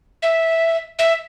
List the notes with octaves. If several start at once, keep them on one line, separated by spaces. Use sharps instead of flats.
E5
E5